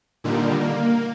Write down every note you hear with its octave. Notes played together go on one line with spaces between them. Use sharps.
A#2 D3 D#3 G3
A#3